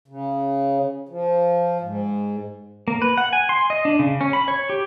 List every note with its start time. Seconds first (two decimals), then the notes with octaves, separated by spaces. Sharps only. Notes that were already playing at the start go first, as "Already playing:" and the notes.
0.08 C#3
1.09 F3
1.81 G#2
2.88 A#3
3.02 B4
3.18 F#5
3.33 G#5
3.49 C6
3.70 D#5
3.85 D4
3.99 C#3
4.21 C#4
4.33 B5
4.48 C#5
4.70 G4